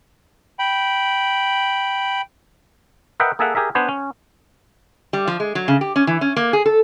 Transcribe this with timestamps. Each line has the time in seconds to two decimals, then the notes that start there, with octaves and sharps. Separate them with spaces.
0.59 G5 B5
3.20 A#4 B4 D#5 E5 F#5 G5
3.39 A#3 G#4 A4 E5 F#5
3.55 G4 G#4 A#4 E5
3.75 B3 D4 B4 C5 G#5
3.89 C#4
5.13 G3
5.27 F3
5.40 G#3
5.55 F#3
5.68 C#3
5.81 G4
5.96 C#4
6.07 E3
6.21 C#4
6.36 A#3
6.53 G#4
6.66 A4